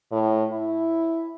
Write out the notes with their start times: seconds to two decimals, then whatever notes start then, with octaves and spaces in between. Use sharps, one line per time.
0.12 A2
0.52 E4